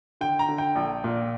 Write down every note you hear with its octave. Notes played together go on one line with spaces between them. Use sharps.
D3 G5
A#5
D3
G5
A#1
A#2